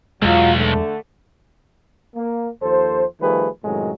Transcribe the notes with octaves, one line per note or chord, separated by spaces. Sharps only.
B1 E2 F#3 G#3 F4
D3 A3
A#3
D#2 F3 A4 C5
D#3 F3 G3 A3 G#4 B4
F#2 A2 C3 D#3 F#3 G#3